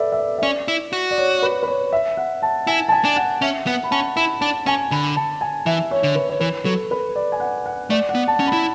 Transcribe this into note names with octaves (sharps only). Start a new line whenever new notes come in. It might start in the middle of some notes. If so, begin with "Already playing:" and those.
Already playing: A4 B4 D5 E5
E5
D5
E5
C#4 D5
E4
F#4
D5
C#5
B4
B4
C#5
E5
F#5
A5
E4 G#5
A5
G#5
D4
F#5
C#4 E5
B3 F#5
B5
C#4 A5
E4 B5
D4 A5
C#4 G#5
D3 B5
A5
G#5
E3 E5
C#5
D3
B4
C#5
E3 B4
F#3 A4
B4
D5
G#5
F#5
F#5
A3 D5
F#5
B3
A5
C#4
B5
E4